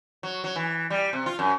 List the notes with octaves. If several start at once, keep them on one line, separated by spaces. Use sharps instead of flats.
F#3
F#3
E3
G3
C3
F4
F#2